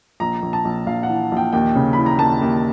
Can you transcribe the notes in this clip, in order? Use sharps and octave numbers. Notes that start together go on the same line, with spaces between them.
A#1 A#5
A#1
A5
A#1
A#1 F5
F#5
E3
A#1
G5
D#2 G5
C#3
E3 B5
A#5
D#2 A5
D#2